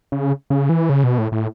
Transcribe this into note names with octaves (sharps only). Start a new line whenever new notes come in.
C#3
C#3
E3
C#3
B2
A2
A2